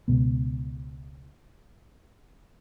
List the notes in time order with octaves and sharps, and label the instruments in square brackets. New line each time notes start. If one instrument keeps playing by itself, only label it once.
[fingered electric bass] C#2 B2 B3